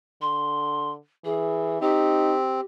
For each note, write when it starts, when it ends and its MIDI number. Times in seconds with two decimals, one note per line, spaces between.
0.21 0.96 50
0.21 0.91 84
1.25 1.78 52
1.25 1.78 68
1.81 2.61 60
1.81 2.35 63
1.81 2.64 67